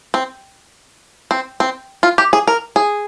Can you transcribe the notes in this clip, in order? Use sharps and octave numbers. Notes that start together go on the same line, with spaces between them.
C4
C4
C4
F4
G4
G#4
A#4
G#4